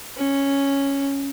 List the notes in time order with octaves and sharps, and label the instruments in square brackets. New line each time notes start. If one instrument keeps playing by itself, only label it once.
[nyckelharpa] C#4